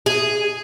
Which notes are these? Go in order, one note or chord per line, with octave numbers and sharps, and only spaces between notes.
G#4